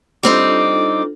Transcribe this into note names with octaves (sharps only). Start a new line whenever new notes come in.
G3 C4 D4 D#4 F4 A4 D6